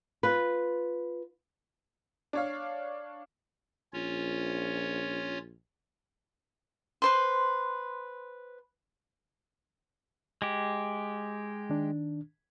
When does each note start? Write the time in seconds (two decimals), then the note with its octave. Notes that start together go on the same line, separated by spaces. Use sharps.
0.23 F4 B4
2.33 D4 C#5 F5
3.93 A#1 C#4 F4 C#5
7.02 B4 C5 C6
10.42 G#3 G4
11.70 D#3 D4